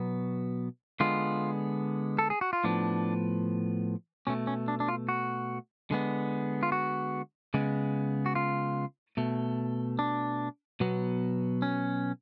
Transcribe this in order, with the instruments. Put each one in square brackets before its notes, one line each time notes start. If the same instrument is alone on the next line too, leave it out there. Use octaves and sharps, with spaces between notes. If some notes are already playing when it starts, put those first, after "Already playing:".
Already playing: [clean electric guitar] B2 F#3 B3
D3 G#3 B3 F4
A4
G#4
F#4
F4
A2 F3 B3 D4
B2 A3 C#4
C#4
D4
D4
F4
F#4
D3 G#3 B3
F4
F#4
C#3 G#3 B3
F#4
F4
B2 A3
D4
B2 F#3 B3
C#4